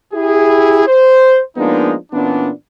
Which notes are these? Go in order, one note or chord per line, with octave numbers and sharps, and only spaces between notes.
E4 G4 G#4
C5
F3 G#3 A#3 B3 D4 D#4
A#2 E3 B3 C#4 D4